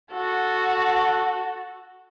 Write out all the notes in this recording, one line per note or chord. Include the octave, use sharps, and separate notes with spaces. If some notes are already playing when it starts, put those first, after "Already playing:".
F#4 A4